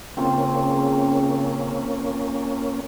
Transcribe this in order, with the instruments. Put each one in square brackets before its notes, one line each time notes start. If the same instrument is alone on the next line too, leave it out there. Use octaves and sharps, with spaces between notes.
[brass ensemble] C#3 [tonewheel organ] A#3 C#4 [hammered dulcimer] C4 F4 C5